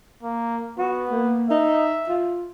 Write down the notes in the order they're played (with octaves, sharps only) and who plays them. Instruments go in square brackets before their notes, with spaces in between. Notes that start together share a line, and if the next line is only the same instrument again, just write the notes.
[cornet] A#3
[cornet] B3 [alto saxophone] F#4
[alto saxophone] A#3
[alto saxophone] D#4 [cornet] E5
[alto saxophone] F4